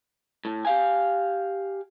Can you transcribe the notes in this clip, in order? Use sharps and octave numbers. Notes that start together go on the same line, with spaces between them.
A2
G4 F5 G#5